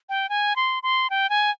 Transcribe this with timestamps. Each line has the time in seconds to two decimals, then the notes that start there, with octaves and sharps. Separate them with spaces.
0.09 G5
0.29 G#5
0.56 C6
0.83 C6
1.10 G5
1.30 G#5